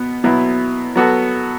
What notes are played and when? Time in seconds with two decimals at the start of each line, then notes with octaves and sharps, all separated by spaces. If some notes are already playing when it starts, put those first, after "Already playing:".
Already playing: B2 B3
0.24 B2 F#3 B3 E4
0.96 F#3 B3 F#4 A4